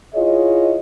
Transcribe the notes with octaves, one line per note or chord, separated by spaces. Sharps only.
E4 F4 G#4 C#5 D#5